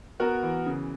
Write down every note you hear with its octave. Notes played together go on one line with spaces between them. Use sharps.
B3 F#4 A#4
E3
C#3